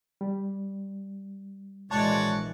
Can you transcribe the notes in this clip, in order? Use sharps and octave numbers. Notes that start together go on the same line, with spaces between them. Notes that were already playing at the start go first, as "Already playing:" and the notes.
G3
A#1 E3 G#3 F#4 C#5 D5 A5